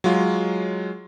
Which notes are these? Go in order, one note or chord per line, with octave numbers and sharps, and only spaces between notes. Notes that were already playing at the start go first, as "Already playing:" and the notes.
F#3 G#3 F4